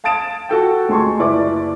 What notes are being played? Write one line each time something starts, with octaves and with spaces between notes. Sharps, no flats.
F5 A5 D#6 A6 D7 E7
F#4 A4 G5
D2 G#3 G#5 A5 C6 C#6
F#1 E4 B4 D5 D6